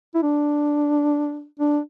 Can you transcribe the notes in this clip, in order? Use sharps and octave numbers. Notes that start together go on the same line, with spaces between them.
E4
D4
D4